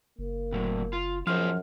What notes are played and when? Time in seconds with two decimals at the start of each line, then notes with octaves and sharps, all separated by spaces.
0.19 F#1 A#3
0.52 A2 F#3
0.93 F4
1.27 F#2 F3 F4 G#4 C5 F6